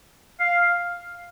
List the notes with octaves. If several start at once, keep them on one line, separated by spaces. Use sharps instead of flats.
F5